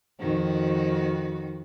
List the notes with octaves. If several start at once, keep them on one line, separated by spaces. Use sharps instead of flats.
F2 D#3 F#4